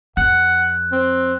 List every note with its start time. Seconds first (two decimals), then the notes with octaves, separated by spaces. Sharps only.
0.17 F2 F#5 F#6
0.92 C4